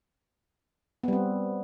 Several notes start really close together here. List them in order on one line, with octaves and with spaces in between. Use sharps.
B3 G3 C4